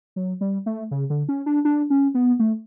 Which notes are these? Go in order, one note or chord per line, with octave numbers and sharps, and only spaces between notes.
F#3
G3
A3
C#3
D3
C#4
D4
D4
C#4
B3
A3